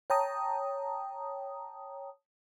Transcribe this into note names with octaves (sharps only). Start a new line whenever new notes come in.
C#5 G5 A5 A#5 D#6